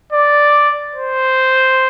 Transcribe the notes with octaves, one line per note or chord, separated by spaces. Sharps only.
D5
C5